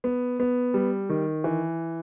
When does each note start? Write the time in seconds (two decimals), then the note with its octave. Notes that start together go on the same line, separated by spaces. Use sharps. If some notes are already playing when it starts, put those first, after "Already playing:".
0.04 B3
0.40 B3
0.74 G3
1.10 D#3
1.44 E3